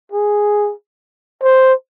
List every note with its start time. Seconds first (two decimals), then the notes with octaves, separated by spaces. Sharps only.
0.12 G#4
1.43 C5